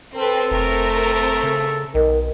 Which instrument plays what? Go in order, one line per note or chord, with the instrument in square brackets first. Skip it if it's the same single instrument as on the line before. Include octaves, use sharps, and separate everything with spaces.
[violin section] C4 B4 [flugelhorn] A4
[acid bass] F1 [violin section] A3 C4 A#4
[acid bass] C#3
[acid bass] B1 [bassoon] D#3